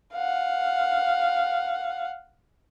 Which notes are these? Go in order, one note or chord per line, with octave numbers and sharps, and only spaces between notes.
F5 F#5